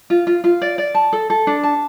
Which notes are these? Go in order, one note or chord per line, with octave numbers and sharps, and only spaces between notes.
F4
F4
F4
D5
D5
A5
A4
A4
D4
A5